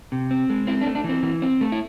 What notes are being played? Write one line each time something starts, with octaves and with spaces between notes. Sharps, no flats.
C3
C4
G#3
C4 E4
D4
A3
D4
E3 C4
E3
C4
A3
E4